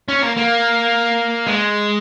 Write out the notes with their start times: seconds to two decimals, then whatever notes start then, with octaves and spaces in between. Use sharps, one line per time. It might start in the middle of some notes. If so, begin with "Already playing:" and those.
0.08 C#4
0.22 A#3
0.36 A#3
1.47 G#3